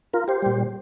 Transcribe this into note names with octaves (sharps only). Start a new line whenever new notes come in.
F4 A#4
G4 C5
A#2 G3